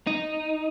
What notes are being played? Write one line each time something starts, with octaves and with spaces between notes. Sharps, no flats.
D#4